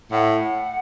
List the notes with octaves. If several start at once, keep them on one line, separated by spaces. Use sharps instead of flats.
A2 F#5